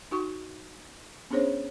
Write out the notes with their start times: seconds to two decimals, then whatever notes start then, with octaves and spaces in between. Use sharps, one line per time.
0.11 D#4 F#4 C#6
1.30 B3 C#4 D4 G#4 C5 C#5